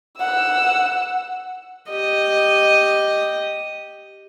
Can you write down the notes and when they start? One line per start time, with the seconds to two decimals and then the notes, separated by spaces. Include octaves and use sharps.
0.18 F#5 E6
1.91 G4 D#5